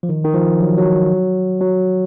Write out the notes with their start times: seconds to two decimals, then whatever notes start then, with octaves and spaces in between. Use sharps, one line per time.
0.03 F3
0.09 D#3
0.24 D#3
0.34 F3
0.60 F#3
0.78 F#3
1.61 F#3